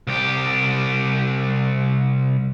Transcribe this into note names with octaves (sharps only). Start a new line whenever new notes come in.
C2 G4